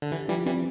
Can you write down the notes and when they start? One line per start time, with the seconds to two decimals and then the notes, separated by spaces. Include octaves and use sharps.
0.02 D3
0.11 E3 G4
0.28 E3 F3 G3
0.45 E3 G3 C4